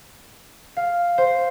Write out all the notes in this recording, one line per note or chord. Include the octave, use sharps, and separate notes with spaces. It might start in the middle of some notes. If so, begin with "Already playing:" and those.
F5
C5